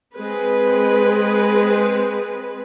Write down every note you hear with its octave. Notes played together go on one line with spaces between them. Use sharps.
G#3 C4 B4